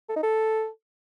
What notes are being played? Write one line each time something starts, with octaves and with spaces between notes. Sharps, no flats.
A4
D#4
A4